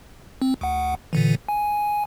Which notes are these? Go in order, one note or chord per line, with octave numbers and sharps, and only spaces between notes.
C4
D2 F#5
A#2 D3 E3
G#5